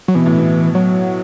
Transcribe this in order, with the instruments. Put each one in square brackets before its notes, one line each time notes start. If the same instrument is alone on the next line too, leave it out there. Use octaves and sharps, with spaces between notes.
[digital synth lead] F#3
[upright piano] B2 [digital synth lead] E3
[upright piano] A2
B2
[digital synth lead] F#3